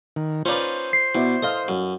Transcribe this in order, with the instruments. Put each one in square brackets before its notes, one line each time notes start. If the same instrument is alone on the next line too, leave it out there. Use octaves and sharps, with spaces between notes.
[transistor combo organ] D#3
[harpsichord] C#4 D#4 B4 [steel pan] F4 D5 [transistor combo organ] C5
[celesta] C7
[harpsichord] B2 [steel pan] E4 B4 D5
[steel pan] A4 D#5 F5 [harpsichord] C6 D#6
[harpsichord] F#2